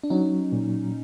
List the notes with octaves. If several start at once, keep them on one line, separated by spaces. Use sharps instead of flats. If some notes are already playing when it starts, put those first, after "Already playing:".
D4
F#3 C#4 D#4
A#2